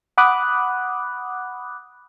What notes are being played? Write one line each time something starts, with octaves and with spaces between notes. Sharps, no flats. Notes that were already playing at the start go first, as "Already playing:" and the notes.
F#5 B5 D6 D#6 F#6